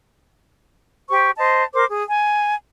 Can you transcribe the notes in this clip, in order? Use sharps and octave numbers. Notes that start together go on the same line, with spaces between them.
G4 C5 C#6
C5 D#5 A5
A#4 C5 D6
G#4
G#5